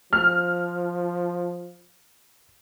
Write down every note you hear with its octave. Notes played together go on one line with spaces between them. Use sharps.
F3 F6